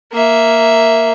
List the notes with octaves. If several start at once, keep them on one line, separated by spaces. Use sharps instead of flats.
A#3 E5